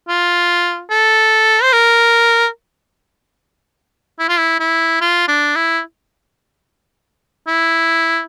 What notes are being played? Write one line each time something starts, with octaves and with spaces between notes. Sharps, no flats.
F4
A4
C5
A#4
E4
F4
E4
E4
F4
D4
E4
E4